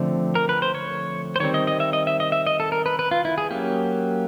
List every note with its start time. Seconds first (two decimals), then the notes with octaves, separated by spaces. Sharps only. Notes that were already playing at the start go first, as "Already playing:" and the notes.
Already playing: D3 F3 A3 C4
0.35 A#4
0.49 B4
0.62 C5
0.75 C#5
1.36 C5
1.40 D#3 G3 C4 C#5
1.54 D#5
1.67 D#5
1.80 E5
1.93 D#5
2.07 E5
2.20 D#5
2.32 E5
2.47 D#5
2.60 A4
2.72 A#4
2.86 B4
2.99 B4
3.11 F4
3.25 E4
3.38 G#4
3.51 F#3 A#3 C#4 G4